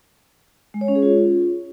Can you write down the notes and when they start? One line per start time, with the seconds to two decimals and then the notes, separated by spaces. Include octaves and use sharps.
0.74 G#3
0.81 C#5
0.88 C#4
0.95 G#4
1.02 F4